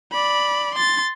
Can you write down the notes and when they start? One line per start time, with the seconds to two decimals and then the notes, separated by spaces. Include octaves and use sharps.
0.12 D5 B5
0.75 C6 A6